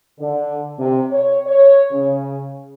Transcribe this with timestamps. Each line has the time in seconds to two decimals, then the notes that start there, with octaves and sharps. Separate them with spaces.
0.19 D3
0.78 C3
1.12 C#5
1.46 C#5
1.91 C#3